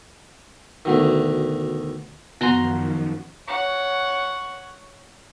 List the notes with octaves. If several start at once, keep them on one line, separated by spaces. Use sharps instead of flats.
D2 B2 D#3
F#2 D#3 F3 B3 F#4 F#5 A#5 C6
C#5 F#5